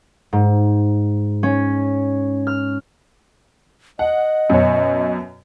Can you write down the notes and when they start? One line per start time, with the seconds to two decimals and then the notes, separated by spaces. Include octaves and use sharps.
0.33 G#2
1.43 C#4
2.47 F6
3.99 D#5 F#5
4.50 F#2 B2 C#5